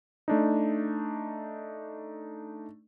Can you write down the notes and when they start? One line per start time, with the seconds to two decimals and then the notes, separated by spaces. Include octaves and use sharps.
0.28 A3 D4 D#4